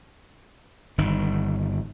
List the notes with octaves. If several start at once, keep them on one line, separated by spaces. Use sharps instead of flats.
G1 D#3